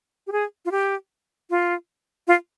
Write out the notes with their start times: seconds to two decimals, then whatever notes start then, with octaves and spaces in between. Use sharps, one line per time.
0.27 G4
0.32 G#4
0.65 F4
0.71 G4
1.50 F4
2.28 F4